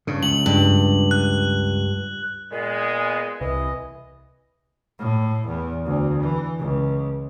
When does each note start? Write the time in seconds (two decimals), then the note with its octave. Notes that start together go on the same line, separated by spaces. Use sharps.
0.07 G2 C#3
0.23 C#2 F#7
0.46 G2
1.11 F#6
2.52 A#2 G#3 B3
3.40 C2 E3 D#5
4.99 A2
5.48 E2
5.86 D2
6.23 E3
6.59 C#2